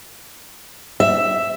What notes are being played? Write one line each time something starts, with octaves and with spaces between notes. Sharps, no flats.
E5